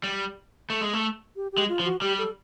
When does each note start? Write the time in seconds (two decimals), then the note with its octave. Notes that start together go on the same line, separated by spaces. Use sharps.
0.04 G3
0.70 A3
0.81 G#3
0.93 A3
1.36 G4
1.52 G4
1.58 G#3
1.69 F4
1.80 F3
1.85 F#4
2.02 G3 G4
2.18 A4